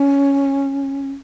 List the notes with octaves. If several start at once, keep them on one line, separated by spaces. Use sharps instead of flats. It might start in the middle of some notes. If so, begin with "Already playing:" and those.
Already playing: C#4